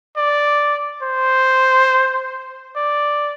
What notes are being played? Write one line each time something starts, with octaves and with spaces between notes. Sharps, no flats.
D5
C5
D5